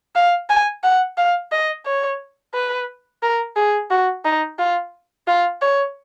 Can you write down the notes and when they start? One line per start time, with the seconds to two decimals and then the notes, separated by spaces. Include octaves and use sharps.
0.16 F5
0.50 G#5
0.84 F#5
1.18 F5
1.52 D#5
1.86 C#5
2.54 B4
3.23 A#4
3.56 G#4
3.91 F#4
4.25 D#4
4.59 F4
5.27 F4
5.62 C#5